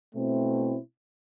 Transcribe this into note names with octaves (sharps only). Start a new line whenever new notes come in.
B2 A3 C4 E4